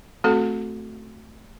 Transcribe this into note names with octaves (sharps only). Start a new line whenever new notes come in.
A3 C4 F#4 A4